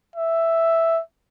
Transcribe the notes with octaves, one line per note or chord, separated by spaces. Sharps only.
E5